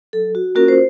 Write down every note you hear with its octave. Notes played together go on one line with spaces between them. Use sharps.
F#3 A4
F#4
A#3 C#4 F4 F#4 A#4
C5